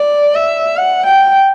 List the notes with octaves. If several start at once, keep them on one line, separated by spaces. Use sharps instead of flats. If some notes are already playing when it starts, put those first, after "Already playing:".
Already playing: D5
E5
F#5
G5